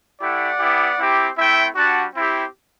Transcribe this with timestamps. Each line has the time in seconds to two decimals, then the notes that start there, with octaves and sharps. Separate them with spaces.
0.20 A3 E4 G4 D5 F#5
0.58 B3 E4 G4
0.98 C4 E4 G4
1.36 A3 C4 E4 E5 G5
1.75 G3 D4 F#4 F#5 A5
2.13 C4 E4 G4